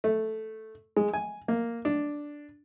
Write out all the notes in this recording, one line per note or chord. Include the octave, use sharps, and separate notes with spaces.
A3
G#3
G#5
A#3
D4